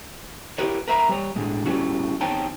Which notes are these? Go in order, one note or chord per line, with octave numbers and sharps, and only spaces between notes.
E4 G4 A#4 B4 C#5
A#4 B4 E5 A#5
G3 C#5
A2 D3 G#3
G3 A3 C#4 E4 F#4
E2 C4 D#4 C#5 G5 A5